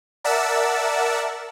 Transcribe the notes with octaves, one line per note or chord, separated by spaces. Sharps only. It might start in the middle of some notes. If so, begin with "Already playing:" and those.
A#4 D5 E5 F#5 A5 E6